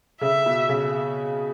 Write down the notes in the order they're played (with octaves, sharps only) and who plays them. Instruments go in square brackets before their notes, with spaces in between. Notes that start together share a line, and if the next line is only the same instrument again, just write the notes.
[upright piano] C#3 [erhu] E5
[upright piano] B2
C#3